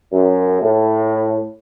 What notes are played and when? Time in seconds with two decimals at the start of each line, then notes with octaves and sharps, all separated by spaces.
0.13 F#2
0.62 A2